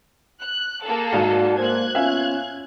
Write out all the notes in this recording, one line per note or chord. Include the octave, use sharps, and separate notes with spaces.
F#6
A#3 G#4 A4
G#2 D#4 F#4 D5 F5
A#3 C5 F#6 G#6
B3 C#4 F4 E5 F5 G#5